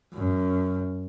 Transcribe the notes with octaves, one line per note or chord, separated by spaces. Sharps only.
F#2